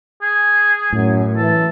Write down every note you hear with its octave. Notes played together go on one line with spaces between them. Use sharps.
G#4
F#2 A2
E3 A4